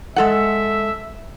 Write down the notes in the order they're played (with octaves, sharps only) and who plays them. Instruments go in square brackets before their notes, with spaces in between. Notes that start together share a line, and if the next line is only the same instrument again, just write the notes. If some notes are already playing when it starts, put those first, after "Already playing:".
[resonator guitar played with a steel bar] G#3 A4 F#5 [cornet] E5